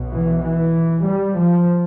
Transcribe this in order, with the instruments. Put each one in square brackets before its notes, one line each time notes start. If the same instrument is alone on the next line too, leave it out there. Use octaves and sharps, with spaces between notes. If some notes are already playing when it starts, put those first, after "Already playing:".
Already playing: [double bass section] B1 B2
E3
E3
G3
F3